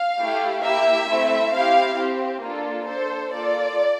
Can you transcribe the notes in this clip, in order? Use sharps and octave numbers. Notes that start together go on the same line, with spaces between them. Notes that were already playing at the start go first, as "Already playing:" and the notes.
Already playing: F5
A3 E4 G4
A#3 E4 G4 E5
A3 C4 E4
C4 E4 G4 F5
C4 G4
A#3 D4 F4 A4
D4 A4 C5
A#3 F4 A4 D5